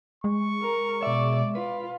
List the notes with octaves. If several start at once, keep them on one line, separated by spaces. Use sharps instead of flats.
G#3 C#6
A#4
B2 D5 E5
F4 B4